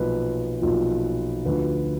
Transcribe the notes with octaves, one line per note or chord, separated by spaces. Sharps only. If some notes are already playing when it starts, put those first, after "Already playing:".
Already playing: B1 A#2 F3 B4
B1 A#2 F3
D2 D3 F3 B4